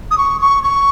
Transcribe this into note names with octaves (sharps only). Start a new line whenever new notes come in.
D#6
C#6
C#6
C#6